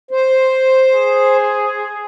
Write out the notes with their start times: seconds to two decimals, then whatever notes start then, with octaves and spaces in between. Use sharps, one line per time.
0.11 C5
0.92 G#4